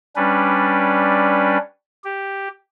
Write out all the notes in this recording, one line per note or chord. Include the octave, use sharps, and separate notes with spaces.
G3 C#4 D4 B4
G4